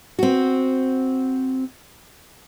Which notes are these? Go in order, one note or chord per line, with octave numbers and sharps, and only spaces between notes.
C4 F#4